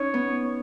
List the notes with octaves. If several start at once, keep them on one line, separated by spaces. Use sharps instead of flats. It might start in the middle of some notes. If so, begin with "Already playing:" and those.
Already playing: C#4 D#4 C#5
B3